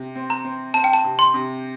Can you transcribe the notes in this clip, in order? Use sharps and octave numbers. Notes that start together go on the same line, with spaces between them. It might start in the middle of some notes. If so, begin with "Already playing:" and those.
Already playing: C3
C4
A#5
C4
C4 A5
G5
A5
C3
C6
C3